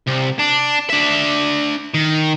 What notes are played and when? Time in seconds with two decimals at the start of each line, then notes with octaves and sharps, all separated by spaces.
0.07 C2
0.39 D4
0.90 D4 E5
1.94 D#3